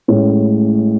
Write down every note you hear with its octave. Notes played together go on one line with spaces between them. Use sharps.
A1 A2 G#3 C#4